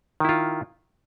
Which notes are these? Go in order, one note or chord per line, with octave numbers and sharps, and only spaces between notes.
D#3 E4 F4